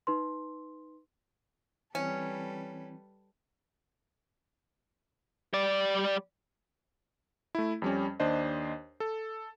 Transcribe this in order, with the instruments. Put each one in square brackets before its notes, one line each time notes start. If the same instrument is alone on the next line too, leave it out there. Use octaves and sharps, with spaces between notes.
[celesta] D#4 B4 C6
[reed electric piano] E3 C4 E4 [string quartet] G3 A4 B4 [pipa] C#4
[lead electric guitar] G3 D5
[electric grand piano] A3 E4
F2 G3 C#4
D#2 D4 C5 D#5
A4